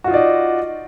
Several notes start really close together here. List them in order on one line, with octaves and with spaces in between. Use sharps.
F#4 F4 D#4 D5 D#5